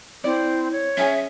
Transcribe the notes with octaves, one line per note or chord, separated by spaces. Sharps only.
C4 E4 D5
C#5
C#4 G#4 E5 G#5